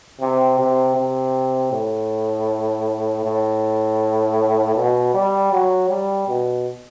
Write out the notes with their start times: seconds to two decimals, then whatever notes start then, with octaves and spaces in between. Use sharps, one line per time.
0.21 C3
0.59 C3
0.96 C3
1.72 A2
3.24 A2
4.76 B2
5.14 G3
5.52 F#3
5.89 G3
6.27 B2